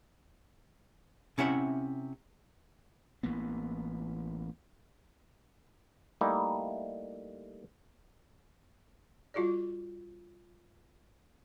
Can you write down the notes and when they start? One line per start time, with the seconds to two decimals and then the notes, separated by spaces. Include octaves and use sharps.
1.38 C3 C#4 E4 E5 F#5
3.23 A1 E3 A#3 B3
6.21 G3 A3 A#3 D#4 E4 D#5
9.34 G3 F4 F#4 G#4 D5